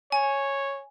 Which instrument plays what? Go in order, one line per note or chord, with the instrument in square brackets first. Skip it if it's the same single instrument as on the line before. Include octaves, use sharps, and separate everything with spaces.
[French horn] C#5 [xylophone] G#5